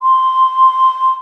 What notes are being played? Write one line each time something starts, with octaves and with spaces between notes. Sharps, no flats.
C6